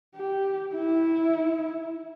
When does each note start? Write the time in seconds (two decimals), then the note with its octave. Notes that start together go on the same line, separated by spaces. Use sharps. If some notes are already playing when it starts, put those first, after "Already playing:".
0.15 G4
0.75 E4